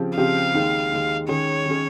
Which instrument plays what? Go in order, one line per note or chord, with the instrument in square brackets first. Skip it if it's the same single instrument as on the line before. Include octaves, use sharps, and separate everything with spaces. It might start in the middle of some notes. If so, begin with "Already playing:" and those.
Already playing: [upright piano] C#3 F3 C4 G4
[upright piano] C#3 F3 C4 G4 [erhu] F5
[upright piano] D#2 D#3 G#3
D#2 D#3 G#3
[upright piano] D#3 G#3 C#4 G#4 [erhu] C#5
[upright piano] D#3 G#3 C#4 G#4